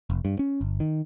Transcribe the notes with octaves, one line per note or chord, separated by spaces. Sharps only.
F1
G2
C#4
G1
D#3